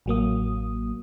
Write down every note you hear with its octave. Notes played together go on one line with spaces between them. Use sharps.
A1 F#3 A#3 D#6